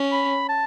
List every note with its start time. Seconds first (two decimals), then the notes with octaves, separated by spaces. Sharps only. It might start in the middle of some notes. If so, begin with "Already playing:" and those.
Already playing: C#4
0.12 B5
0.49 A5